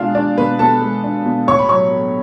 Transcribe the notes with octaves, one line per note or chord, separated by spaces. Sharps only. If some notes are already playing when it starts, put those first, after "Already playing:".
Already playing: B2 G#3 D4 F4 F5
D4 D5
B2 B4
B2 A4 A5
G#3
D4
B2
A2 C#5 C#6
B5
F#3 C#5 C#6
A3